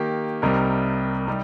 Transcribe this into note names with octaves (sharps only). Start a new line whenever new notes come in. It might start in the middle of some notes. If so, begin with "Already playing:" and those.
Already playing: D#3 A#3 G4
C2 C3 G3 D#4 A#4
C3 G3 D#4